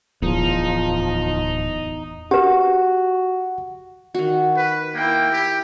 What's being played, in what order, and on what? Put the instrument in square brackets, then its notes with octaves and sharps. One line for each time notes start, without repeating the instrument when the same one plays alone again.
[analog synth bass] D1 [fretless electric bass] E2 [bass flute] F3 [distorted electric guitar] D#4
[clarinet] F#4 [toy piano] G4 B4 [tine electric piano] F#5
[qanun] D#3 F#4
[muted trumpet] B4
[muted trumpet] A#3 [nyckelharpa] E4 G5
[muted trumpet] G4